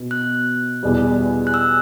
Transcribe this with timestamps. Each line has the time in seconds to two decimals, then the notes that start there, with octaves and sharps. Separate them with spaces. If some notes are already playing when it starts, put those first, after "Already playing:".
Already playing: B2
0.11 F#6
0.83 E2 B2 G3
1.47 F#6
1.54 E6